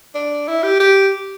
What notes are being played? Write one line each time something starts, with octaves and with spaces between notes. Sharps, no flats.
D4
E4
G4
G4